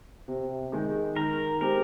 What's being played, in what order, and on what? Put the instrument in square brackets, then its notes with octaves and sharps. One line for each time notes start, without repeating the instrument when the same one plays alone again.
[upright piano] C3
D#3 G#3 D#4
[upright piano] D#3 [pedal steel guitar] A#4
[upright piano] G#3 C4 G4 [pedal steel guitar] A#4